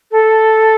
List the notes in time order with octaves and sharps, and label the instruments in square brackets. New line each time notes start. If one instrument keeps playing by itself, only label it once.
[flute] A4